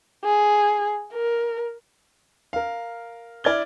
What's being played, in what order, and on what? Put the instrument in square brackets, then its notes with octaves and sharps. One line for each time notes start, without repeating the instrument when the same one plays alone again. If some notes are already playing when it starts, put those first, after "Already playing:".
[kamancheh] G#4
A#4
[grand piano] A#4 F5
E4 D5 F6 G#6 G7